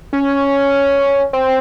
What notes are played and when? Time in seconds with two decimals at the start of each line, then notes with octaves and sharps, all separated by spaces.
0.13 C#4
1.33 C4